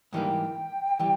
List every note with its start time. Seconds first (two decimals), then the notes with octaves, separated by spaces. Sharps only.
0.13 G#2 E3 G3 A#3 D#4 G5
0.99 E3 G3